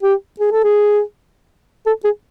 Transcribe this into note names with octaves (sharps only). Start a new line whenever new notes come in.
G4
G#4
A4
G#4
A4
G#4